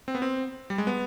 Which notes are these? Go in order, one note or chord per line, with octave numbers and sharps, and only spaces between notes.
C4
B3
C4
G3
G#3
B3